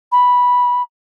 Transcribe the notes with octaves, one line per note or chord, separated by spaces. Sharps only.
B5